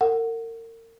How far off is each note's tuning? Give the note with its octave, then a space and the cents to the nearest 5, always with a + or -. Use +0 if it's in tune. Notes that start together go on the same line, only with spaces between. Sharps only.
A#4 -35 F#5 +0